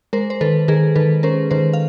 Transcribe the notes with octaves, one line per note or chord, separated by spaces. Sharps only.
G#3 A#4 C5
C5
D#3 A4 B4
D#3 G#4 A#4
D#3 A4 B4
C#4 A#4 C5
D#3 A#4 C5
F5